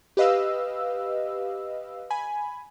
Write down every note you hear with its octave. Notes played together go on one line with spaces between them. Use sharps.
G4 B4 D#5 F5 E6
G#5 B5